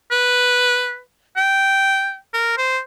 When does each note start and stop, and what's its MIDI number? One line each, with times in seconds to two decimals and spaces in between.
0.11 0.99 71
1.37 2.16 79
2.34 2.55 70
2.57 2.80 72